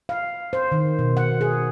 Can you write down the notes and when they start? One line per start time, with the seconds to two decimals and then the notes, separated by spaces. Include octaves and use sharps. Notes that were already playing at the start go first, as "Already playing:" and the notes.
0.09 F5
0.53 C5
0.72 D#3
0.99 B2
1.17 F#5
1.41 G#4